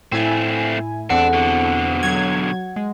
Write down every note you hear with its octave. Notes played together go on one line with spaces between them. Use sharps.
A2 A3 C4 E4 G#5
E2 C4 D4 A4 F#5
B2 D3
F#3 G#6
G#3